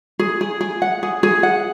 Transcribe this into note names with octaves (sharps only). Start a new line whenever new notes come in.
G#4
G#4
G#4
F#5
G#4
G#4
F#5